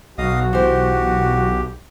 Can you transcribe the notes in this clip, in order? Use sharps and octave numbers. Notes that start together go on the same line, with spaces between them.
B1 F#4 D#5 F5 D#6
E3 G4 C5